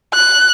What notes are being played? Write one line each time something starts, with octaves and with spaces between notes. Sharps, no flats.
F#6